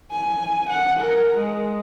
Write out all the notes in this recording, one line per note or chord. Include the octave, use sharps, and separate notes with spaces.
G#5
F#5
A#4
G#3